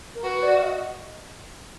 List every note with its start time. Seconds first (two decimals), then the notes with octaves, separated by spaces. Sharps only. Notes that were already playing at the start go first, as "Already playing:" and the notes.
0.15 A#4
0.23 F#4 B4
0.42 D5
0.57 F5
0.62 D#5